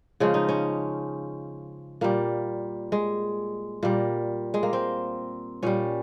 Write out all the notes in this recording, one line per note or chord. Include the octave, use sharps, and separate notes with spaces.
C#3 F3 G#3 C#4
D#4
C#4
A#2 G3 A#3
G#3
A#2 G3 A#3
G#3
A#3
C4
A#2 G3 C#4